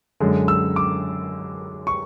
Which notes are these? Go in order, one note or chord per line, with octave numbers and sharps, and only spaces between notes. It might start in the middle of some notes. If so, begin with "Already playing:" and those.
F#2 D3 G#3
E6
D6
C#6